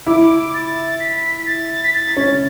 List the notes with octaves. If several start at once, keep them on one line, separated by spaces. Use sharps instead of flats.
E4 D6
A6
B6
A6
B6
A6
C#4